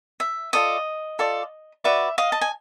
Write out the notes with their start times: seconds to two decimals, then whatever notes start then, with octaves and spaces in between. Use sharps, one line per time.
0.20 E5
0.53 F4 A4 D5 D#5
1.19 F4 A4 D5
1.84 F#4 B4 D5 E5
2.18 D#5 F5
2.32 A5
2.41 G#5